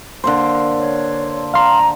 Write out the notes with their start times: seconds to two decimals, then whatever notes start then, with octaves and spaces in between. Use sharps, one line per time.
0.24 D3 A#3 C5
0.78 C#5
1.54 F5 A#5 C6